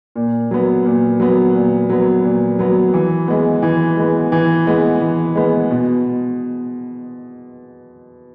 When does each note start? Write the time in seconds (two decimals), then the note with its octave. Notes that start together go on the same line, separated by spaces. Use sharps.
0.16 A#2
0.51 F#3 B3
0.85 A#2
1.20 F#3 B3
1.55 A#2
1.89 F#3 B3
2.24 A#2
2.59 F#3 B3
2.94 E3
3.28 G#3 B3
3.63 E3
3.97 G#3 B3
4.32 E3
4.67 G#3 B3
5.01 E3
5.36 G#3 B3
5.71 B2